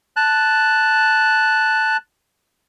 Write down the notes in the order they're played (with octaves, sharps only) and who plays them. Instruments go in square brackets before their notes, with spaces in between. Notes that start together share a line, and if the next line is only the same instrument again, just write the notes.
[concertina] A5 F#6